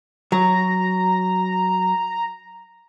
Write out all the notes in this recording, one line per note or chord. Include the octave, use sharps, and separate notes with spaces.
F#3 A#5